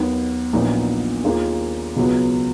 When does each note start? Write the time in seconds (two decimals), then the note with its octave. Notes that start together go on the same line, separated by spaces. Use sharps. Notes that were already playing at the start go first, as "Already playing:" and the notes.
Already playing: D#2 D#3 F#3 B3
0.53 A#1 A#2 F#3 B3 D#4
1.24 D#2 D#3 A#3 F4 G#4
1.96 C#2 B2 F#3 B3 F#4